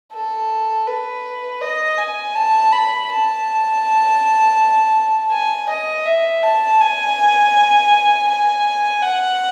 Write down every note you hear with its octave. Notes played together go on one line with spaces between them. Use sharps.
A4
B4
D#5
G#5
A5
B5
A5
G#5
D#5
E5
A5
G#5
G#5
F#5